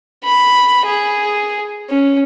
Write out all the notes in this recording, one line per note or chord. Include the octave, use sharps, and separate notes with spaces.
B5
G#4
C#4